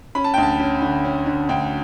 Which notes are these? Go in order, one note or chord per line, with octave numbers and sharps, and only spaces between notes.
C#4 B5
A5
D2 G5
A5
C#4
D3
C#4
D3
D2 G5